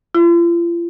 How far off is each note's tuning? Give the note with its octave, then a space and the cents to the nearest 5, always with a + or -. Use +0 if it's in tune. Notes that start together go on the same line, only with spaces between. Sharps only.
F4 -40